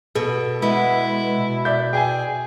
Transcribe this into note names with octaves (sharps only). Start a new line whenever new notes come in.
B2 A4
G#3 B3 E4
B2
D5 E5 G6
G#4 G5 G#5